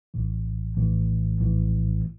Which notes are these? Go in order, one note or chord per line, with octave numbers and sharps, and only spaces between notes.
A#1 A2 E3
A#1 A2 E3
A#1 A2 E3